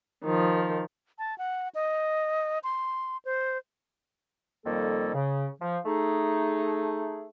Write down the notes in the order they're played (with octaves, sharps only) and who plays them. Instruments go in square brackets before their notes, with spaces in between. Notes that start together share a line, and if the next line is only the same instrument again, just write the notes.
[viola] D#3 F3
[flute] A5
F#5
D#5
C6
C5
[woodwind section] F2 D#3 G3 A#3 A4
C#3
F3
A3 D#4 G#4